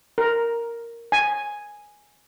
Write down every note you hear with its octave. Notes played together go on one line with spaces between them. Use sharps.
A#4
G#5